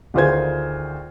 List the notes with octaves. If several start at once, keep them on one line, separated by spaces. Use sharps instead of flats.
D2 D#3 F4 G#4 C5 G#6